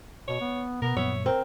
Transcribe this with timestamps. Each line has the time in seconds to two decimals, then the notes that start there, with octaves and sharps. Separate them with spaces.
0.28 B2 C#5
0.41 B3
0.82 B2 B3 A#4
0.96 F#2 A#2 F3 C#5 E5
1.26 C4 A#4